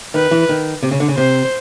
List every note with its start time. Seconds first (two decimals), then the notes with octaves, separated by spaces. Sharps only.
0.14 D#3 B4
0.31 E3
0.49 D#3
0.83 C3
0.91 C#3
1.00 D3
1.08 C#3
1.17 C3 C5